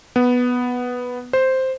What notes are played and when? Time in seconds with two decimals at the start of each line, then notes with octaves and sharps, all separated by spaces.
0.16 B3
1.33 C5